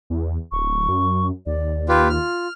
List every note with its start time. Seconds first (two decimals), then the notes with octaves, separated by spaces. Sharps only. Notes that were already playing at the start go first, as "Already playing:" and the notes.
0.10 E2
0.52 D1 C#6
0.89 F#2
1.46 D#2 D5
1.89 F4 G4 B4
2.10 F4 F6